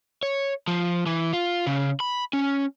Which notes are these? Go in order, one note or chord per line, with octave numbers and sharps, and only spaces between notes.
C#5
F3
E3
F4
C#3
B5
C#4